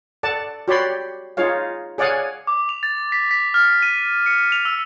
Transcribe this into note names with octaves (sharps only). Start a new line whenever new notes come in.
A4 D5 F#5 A5
F#4 G4 C#5 D5 B5 C6
D#4 F4 G#4 C#5 F5
G#4 C#5 D5 F5 F#5 G#5
D6
F7
A6
B6
B6
F6
D#7
C#7
F7
E6